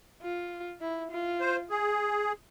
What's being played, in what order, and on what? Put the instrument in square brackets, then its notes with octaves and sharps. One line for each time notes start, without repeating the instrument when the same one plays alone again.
[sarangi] F4
E4
F4
[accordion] C5
G#4